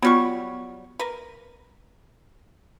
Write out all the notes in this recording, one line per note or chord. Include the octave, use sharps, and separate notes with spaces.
F#3 G3 B3 F4 C#6
A#4 B4